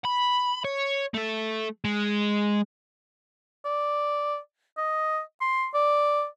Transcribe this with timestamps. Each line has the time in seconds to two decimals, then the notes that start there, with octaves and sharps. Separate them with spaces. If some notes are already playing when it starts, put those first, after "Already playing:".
0.05 B5
0.65 C#5
1.14 A3 A4
1.84 G#3
3.65 D5
4.78 D#5
5.41 C6
5.74 D5